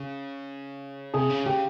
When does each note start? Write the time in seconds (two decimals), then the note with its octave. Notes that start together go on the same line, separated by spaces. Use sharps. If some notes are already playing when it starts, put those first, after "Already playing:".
Already playing: C#3
1.14 C3 G#4
1.30 C#3
1.46 C#3 G4